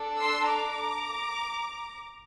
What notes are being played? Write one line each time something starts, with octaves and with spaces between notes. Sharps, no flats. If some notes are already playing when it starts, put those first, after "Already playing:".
Already playing: D4 A4
C6 E6
A#5 D6